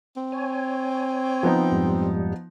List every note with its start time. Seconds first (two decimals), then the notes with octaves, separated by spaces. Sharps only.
0.17 C4
0.32 C#5 G#5
1.43 F3 B3 D#4
1.72 F2 G#2 G3